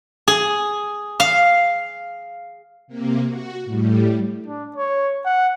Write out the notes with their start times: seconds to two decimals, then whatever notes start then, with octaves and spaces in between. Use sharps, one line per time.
0.28 G#4
1.20 F5
2.87 C3 A#3
3.27 F#4
3.65 A2 G3
4.46 D4
4.76 C#5
5.25 F#5